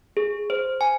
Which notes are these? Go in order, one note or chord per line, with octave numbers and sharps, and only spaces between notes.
G#4
C5
G#5